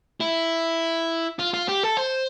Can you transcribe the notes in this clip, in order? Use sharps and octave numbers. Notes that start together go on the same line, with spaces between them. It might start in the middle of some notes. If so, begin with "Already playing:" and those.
E4
F4
F4
G4
A4
C5